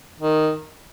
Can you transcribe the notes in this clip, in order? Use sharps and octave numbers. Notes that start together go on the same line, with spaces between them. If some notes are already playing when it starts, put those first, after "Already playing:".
D#3